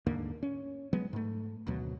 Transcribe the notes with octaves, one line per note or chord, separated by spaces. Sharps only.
D#2 G#2 D3 A#3
C#4
F#3 G#3 B3
G#2 A3
G#1 D2 B2 F#3